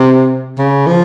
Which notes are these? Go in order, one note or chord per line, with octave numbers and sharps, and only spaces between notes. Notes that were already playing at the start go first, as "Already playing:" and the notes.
Already playing: C3
C#3
F3